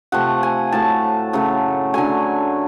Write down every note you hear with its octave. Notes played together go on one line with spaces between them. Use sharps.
C3 F3 A3 F#5
G#5
A2 F#3 A3 A5
C#3 F#3 A3
D3 F#3 A3 G#5